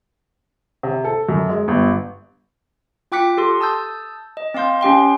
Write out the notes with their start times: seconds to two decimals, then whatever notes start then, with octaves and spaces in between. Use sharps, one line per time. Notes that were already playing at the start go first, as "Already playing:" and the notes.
0.83 C3
1.05 A4
1.29 F#2
1.49 G#3
1.68 G1
3.12 F4 G5 D6 F#6 B6 C#7
3.37 G4 A4 C6
3.61 A5 D#6 E6 G6
4.37 D#5
4.54 C4 D#5 F5 C6 G6
4.81 C#4 G4 G5 C6